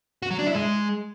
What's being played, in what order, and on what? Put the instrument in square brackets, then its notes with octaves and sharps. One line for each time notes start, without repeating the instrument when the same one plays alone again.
[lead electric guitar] F#4
F#3
D4
E4
G#3